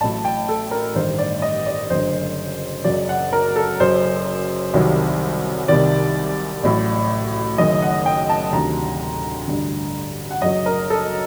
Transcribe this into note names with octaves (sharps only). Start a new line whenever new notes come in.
A1 A2 F#3 A5
G5
A4
A#4
A1 G2 D#3 C5
D5
D#5
D5
F#1 F#2 D3 C5
F#1 F#2 F#3 D5
F#5
A#4
A4
F#1 F#2 F#3 C5
C2 C3 D#3 F#3
C2 C3 D#3 D5
A1 A2 F#3
F#1 F#2 D#3 D#5
F#5
G5
A5
D2 C3 D#3 A#5
A1 G2 D3
F#5
F#1 F#2 F#3 D#5
A#4
A4